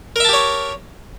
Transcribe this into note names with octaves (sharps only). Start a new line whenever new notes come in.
G4 A#4 C#5 E5 A5